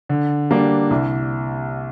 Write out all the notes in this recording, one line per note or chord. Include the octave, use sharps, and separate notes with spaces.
D3
G3 A#3 D4
C2